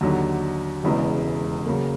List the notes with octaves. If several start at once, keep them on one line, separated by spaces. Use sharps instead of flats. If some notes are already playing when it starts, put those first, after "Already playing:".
D#2 D3 F#3
E1 E2 C#3 E3 G#3
C#3 F#3 A#3